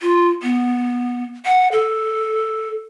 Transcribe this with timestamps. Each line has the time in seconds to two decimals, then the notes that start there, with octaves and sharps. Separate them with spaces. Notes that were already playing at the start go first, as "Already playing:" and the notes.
0.01 F4
0.43 B3
1.46 F#5
1.72 A4